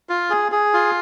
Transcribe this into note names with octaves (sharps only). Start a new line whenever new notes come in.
F4
G#4
G#4
F4